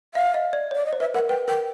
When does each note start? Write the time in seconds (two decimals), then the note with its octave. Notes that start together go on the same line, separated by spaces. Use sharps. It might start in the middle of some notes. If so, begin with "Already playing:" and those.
0.15 E5 F5
0.34 D#5
0.53 D5
0.71 C#5 D5
0.86 D#5
0.93 C5
1.00 B4 E5
1.14 A#4 F#5
1.29 B4 G5
1.48 A#4 G5